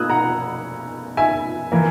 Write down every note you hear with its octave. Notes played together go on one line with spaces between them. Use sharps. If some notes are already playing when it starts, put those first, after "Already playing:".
Already playing: B2 A#3 D#6 E6 F#6 G#6
F#5 A#5
E5 G#5
E3 A#3